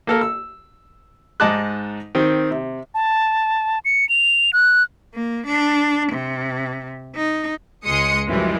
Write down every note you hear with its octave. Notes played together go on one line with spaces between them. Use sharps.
A#3 A4 A#4
E6
G#2 D#4 D#5 A5 D6 F#6
D#3 C4
C3
A5
C#7
F7
F#6
A#3
D4
C3
D#4
C#2 G#3 C6 D#6 C#7
F#2 E3 F3 G3 G#3